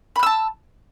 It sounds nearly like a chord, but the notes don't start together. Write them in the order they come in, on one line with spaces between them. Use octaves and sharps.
B5 F#6 E6 A5